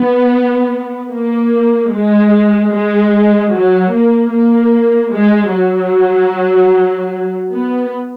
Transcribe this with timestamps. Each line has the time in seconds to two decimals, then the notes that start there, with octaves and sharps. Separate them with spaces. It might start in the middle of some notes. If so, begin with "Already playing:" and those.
Already playing: B3
1.13 A#3
1.92 G#3
2.72 G#3
3.53 F#3
3.92 A#3
4.32 A#3
5.13 G#3
5.52 F#3
7.52 B3